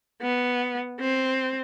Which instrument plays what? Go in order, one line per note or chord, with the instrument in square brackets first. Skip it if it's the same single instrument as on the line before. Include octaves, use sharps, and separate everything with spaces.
[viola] B3
C4